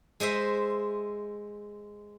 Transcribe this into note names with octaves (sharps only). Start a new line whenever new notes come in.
G#3 C5 D#5 E5